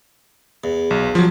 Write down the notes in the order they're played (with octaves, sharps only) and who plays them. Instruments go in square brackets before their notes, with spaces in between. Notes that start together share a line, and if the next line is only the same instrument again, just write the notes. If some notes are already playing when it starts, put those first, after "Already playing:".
[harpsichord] E2
[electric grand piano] B1
F3 F#3